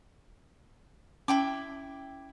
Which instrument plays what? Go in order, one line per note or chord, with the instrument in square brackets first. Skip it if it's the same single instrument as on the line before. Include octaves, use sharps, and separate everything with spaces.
[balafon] C#4 [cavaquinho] E4 G5 D6